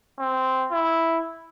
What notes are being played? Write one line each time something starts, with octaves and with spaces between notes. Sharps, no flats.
C4
E4